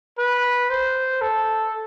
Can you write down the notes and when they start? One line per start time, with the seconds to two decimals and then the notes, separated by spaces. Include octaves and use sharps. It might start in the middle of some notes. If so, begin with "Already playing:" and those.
0.18 B4
0.70 C5
1.21 A4